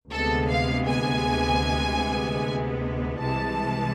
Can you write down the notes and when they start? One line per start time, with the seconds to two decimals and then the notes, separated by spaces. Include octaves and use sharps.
0.11 D2 C3 G#3 B3 A4
0.50 F5
0.88 G#5
3.19 C2 C3 E3 G#3 A5